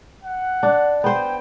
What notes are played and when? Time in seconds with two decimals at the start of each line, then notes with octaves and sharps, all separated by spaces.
0.24 F#5
0.63 D4
1.04 B3 C5 G5